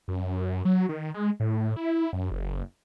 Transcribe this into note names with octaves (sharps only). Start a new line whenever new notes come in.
F#2
F#3
D#3
G#3
A2
E4
F#2
F#1